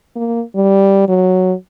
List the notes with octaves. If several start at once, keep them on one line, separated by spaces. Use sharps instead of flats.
A#3
G3
F#3